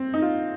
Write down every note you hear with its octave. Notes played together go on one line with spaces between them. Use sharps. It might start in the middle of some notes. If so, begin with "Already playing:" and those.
Already playing: C4
D#4
F4